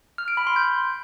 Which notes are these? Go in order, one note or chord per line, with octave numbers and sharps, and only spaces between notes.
F6
D7
B5
C6
G6